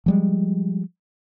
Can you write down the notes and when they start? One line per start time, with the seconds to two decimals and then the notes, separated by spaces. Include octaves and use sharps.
0.06 F3 G3 G#3